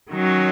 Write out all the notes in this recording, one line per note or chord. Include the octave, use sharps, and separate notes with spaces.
D#3 F#3 C#4